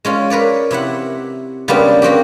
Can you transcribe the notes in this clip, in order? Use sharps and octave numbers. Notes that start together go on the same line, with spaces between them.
G#3 C#4 F4
A#4 B4 C#5 D5
C3 E4 E5 F#5
C#3 G3 G#3 A#3 B3 D4
A#3 C4 F#4 G4